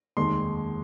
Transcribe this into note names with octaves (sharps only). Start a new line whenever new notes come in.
F1 D#2 D#3 G#3 C6